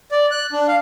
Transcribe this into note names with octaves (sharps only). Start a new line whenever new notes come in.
D5
F#6
D4
F5